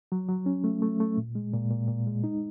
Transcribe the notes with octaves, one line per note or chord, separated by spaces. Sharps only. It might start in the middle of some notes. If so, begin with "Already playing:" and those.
F#3
F#3
C#4
A3
A3
A3
A#2
G#3
A#2
A#2
A#2
G#3
D#4